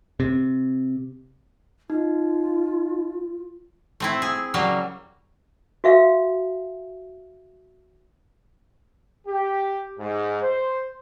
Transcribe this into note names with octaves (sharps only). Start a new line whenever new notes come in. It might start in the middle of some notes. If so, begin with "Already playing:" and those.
C3
D#4 F4
A3 C4 E4
G#4
C#3 F#3 G3 A#3
F#4 E5 F5
G4
G#2
C5